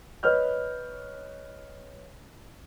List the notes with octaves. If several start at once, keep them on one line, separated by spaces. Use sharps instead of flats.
B4 C#5 D#5 F6 G6